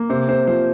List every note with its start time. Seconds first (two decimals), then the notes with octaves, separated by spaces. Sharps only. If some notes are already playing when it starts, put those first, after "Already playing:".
Already playing: A#3
0.10 C3 C5
0.28 C3 C5
0.47 F3 C5